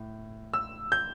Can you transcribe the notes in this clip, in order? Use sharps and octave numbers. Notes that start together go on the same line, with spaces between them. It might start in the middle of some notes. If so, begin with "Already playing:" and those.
Already playing: A2
E6
G6